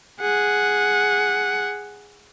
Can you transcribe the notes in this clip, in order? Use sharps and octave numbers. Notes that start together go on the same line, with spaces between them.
G#4 F#5